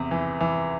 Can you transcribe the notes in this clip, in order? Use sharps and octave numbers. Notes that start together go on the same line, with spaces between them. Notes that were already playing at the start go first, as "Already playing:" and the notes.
Already playing: E2 C3
E3
E3